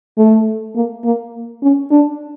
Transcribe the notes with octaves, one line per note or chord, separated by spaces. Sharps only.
A3
A#3
A#3
C#4
D4